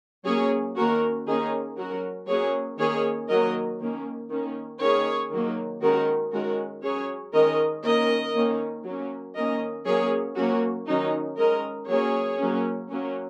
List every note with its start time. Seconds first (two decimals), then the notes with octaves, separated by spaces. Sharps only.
0.26 F#3 A#3 C#4 G#4 C#5
0.76 D#3 A#3 C#4 F#4 A#4
1.27 D#3 A#3 C#4 D#4 G#4
1.77 F#3 C#4 F#4 A#4
2.28 F#3 A#3 C#4 G#4 C#5
2.79 D#3 A#3 C#4 G#4 C#5
3.29 D#3 F#3 A#3 A#4 D#5
3.79 D#3 A#3 C#4
4.30 D#3 A#3 C#4
4.80 D#3 A#3 C#4 G#4 C#5
5.31 D#3 F#3 A#3
5.82 D#3 G#3 C#4 F#4 A#4
6.32 D#3 G#3 C#4 F#4 A#4
6.83 F#3 C#4 G#4 C#5
7.33 D#3 G#3 C#4 A#4 D#5
7.84 D#3 A#3 C#4 A#4 D#5
8.35 D#3 A#3 C#4
8.85 F#3 A#3 C#4
9.35 D#3 A#3 C#4 A#4 D#5
9.86 F#3 A#3 C#4 G#4 C#5
10.36 F#3 A#3 C#4 F#4
10.88 D#3 F#3 C#4 D#4
11.38 D#3 G#3 C#4 A#4 D#5
11.88 F#3 A#3 C#4 G#4 C#5
12.38 F#3 A#3 C#4
12.89 F#3 A#3 C#4